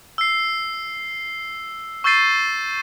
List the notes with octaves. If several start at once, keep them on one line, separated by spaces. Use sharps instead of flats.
E6 C7
C#6 E6 G6 A6 C7 D#7